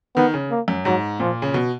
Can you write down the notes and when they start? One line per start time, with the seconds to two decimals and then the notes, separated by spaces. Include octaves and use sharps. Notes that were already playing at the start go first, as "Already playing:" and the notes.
0.16 D#3 B3
0.34 C#3
0.50 A#3
0.68 F#2
0.85 G#2 F#3
1.20 A#2 F3
1.42 C#3
1.54 B2